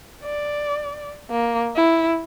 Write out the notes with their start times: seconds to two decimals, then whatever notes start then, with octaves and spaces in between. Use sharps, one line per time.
0.24 D5
1.30 A#3
1.76 E4